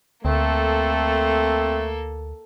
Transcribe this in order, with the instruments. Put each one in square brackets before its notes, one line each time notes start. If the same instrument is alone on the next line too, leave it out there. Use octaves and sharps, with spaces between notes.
[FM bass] D2 [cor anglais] A3 [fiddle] A#3 A4 [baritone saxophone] C4